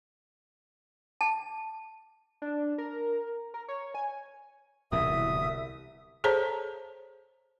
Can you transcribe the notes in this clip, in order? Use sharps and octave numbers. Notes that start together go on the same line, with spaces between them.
A5
D4
A#4
A#4
C#5
G#5
D1 C2 B2 E3 E5 D#6
G#4 A4 C5 C#5 A5 A#5